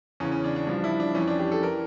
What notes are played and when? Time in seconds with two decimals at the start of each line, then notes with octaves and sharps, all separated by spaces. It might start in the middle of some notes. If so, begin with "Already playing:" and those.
0.20 E2 C#3 E3 C#4
0.31 C#4
0.44 D4
0.56 D4
0.67 G2 F3 D4
0.84 E4
1.00 D4
1.15 F2 E3 C#4
1.27 D4
1.39 G4
1.52 A4
1.63 E3 A#4